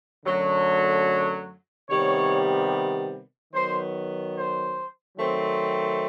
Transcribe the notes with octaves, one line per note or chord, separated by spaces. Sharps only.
F#2 D3 F#3 A3
C3 D#3 G3 B3 C#5
D#3 F#3 B3 C5
C5
D#3 F#3 A3 C4